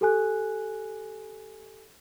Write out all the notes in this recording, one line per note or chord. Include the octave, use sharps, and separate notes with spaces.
G4 A4 G#5 F#6